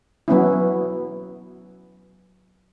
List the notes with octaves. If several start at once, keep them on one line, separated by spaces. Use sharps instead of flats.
F#3 B3 C#4 E4